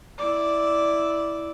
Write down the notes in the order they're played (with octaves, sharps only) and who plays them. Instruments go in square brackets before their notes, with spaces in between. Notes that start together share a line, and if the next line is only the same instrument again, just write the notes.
[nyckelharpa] E4 D5